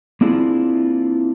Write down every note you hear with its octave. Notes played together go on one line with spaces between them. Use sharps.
A#3 C4 D4 E4 F4 G#4